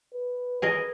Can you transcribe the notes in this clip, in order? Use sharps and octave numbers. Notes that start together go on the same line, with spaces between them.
B4
G#4 A#4 B4 D#5